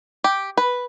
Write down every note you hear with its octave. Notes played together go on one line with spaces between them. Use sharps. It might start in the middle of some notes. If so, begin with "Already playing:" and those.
G4
B4